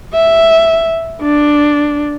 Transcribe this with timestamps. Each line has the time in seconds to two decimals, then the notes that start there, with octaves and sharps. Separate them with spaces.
0.14 E5
1.22 D4